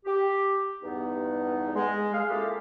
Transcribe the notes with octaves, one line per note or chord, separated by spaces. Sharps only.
G4
E2 G2 B3 D#4
G#3
G#4 F5
A#3 C#4 E4 F4 G4 A4